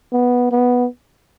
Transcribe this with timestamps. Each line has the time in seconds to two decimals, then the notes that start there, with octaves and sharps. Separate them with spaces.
0.13 B3
0.51 B3